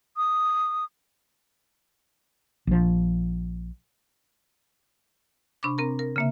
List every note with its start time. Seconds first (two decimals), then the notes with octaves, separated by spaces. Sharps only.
0.17 D#6
2.67 A#1 F3
5.63 C3 D4 B5 C#6 D6
5.78 C4 A#4 A#5
5.99 A#4
6.16 C#3 A#3 E5